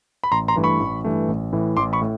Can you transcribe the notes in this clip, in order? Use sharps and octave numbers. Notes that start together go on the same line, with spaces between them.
B5
A1 A#5 C6
A#5 C6
G2 E3 A3
B5 C#6
A1
G2 E3 A3
A1
A2 E3
A1 C6 D6
B5 C#6
A2